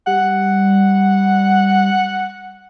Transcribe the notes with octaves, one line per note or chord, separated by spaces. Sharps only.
G3 F#5